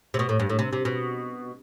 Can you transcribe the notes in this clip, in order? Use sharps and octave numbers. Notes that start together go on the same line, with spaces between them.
C3
B2
A2
G2
A2
C3
C3
B2